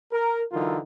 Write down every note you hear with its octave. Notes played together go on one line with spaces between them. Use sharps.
A#4
D3 E3 F#3 D#4 F4 A#4